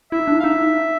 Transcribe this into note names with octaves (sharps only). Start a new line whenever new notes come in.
E4 E5
D#4
D4
E4
F5
D#4 E5